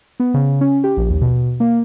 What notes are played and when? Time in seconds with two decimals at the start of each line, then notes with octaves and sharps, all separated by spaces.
0.20 B3
0.34 C#3
0.61 C#4
0.84 G4
0.97 A#1
1.09 D#2
1.21 B2
1.60 A#3